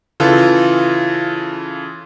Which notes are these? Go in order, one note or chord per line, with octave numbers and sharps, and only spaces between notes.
C#3 E3 F4 A4